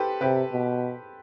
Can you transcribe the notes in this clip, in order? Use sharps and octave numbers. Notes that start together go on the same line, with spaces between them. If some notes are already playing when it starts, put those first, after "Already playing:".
Already playing: G4 A4 B4 C5
C3 G4 B4
B2